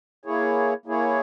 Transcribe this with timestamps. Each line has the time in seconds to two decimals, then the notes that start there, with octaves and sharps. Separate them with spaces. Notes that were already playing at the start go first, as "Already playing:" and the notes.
0.25 A#3 E4 G#4 C#5
0.86 A#3 E4 G#4 C#5